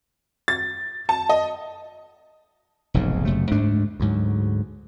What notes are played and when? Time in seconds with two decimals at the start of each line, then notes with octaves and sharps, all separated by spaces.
0.48 A6
1.09 A5
1.29 D#5
2.94 F1 B1 G#2 C#3
3.25 F#1 F#2 C3 A3
3.51 D2 G#2 A3 D4
4.00 D2 G#2 F#3